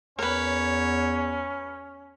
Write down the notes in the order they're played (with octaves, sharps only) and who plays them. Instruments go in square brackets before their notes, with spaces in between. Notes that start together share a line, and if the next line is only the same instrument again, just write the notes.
[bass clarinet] E2 [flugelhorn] C#4 [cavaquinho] A#4 B4 [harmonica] C#5